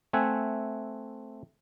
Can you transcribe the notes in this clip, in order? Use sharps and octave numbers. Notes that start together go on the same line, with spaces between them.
A3 C4 E5 F#5 G#5